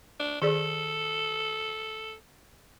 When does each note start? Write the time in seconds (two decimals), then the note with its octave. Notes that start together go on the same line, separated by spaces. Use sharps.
0.20 D4
0.42 D#3 G#4 A4 D5